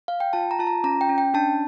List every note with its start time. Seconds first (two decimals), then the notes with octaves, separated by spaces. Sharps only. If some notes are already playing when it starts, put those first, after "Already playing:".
0.08 F5
0.20 G5
0.33 F4 A5
0.51 A#5
0.59 F4 A5
0.67 A#5
0.84 C#4 A#5
1.01 G5
1.09 C#4
1.18 G5
1.34 D4 A5